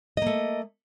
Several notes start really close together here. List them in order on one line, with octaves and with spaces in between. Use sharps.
D#5 A#3 A3